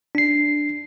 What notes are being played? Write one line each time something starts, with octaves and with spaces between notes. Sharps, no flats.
D4 C7